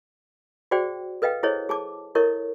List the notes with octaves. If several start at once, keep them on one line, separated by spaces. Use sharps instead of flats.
F#4 G#4 C5 D5 G5
A4 B4 D#5 F5 G5
E4 G#4 A4 C5 C#5 D#5
G#4 A5 D6
E4 A4 A#4 C#5 D#5 C#6